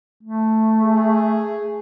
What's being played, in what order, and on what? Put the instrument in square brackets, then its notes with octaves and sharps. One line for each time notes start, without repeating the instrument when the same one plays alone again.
[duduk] A3
[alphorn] G#4